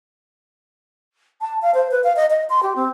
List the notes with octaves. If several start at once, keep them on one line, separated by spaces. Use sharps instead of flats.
A5
F5
C5
B4
F5
D#5
D#5
C6
G4
C4